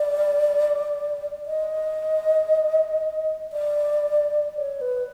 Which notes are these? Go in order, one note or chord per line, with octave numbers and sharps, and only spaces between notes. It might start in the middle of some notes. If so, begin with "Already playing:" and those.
Already playing: D5
D#5
D5
C#5
B4